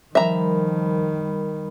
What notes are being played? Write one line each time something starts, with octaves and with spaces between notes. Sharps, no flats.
D#3 F3 G3 A#4 E5 A#5 B5